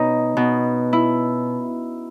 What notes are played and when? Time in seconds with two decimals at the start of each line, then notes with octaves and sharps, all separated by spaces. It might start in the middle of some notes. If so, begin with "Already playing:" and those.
Already playing: B2 C#4 D#4
0.37 B2
0.93 E4